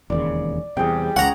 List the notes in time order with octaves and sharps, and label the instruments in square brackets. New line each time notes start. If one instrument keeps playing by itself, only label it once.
[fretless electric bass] E1 D#2 C#3 [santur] D5
[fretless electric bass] E2 C3 [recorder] G3 [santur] G#4 G5
[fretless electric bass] C#2 [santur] C#4 [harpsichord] F#5 A#5